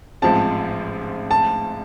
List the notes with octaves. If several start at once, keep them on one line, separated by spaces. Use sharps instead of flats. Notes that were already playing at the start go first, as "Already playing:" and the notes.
A1 G#2 F3 G#3 C4 A5
A5